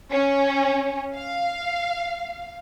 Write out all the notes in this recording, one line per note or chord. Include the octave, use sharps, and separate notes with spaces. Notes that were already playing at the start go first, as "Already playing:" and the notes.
C#4
F5